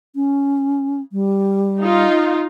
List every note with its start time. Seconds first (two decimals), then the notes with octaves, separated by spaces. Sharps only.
0.15 C#4
1.12 G3
1.82 D#4 F4